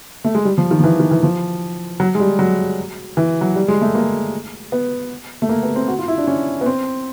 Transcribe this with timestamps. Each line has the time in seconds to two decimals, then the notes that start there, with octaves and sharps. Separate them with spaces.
0.24 A3
0.35 G#3
0.45 G3
0.58 F3
0.71 D#3
0.80 F3
0.84 E3
1.00 D#3
1.11 E3
1.23 F3
2.00 F#3
2.15 G#3
2.20 G3
2.39 F#3
3.17 E3
3.41 F#3
3.56 G3
3.68 G#3
3.81 A3
3.95 A#3
4.72 B3
5.42 A3
5.49 A#3
5.63 B3
5.76 C4
5.88 F#4
5.99 F4
6.08 E4
6.18 D4
6.27 C#4
6.61 B3
6.66 C4